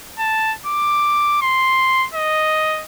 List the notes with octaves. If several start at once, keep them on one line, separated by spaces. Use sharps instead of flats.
A5
D6
C6
D#5